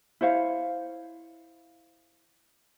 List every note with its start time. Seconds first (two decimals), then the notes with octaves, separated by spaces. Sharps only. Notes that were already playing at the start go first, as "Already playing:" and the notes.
0.21 E4 C5 C#5 F5